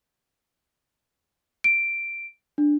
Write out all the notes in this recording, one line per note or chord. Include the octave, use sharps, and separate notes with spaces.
D7
D4